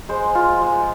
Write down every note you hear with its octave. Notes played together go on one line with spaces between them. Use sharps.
G#3 C5
F4
G#3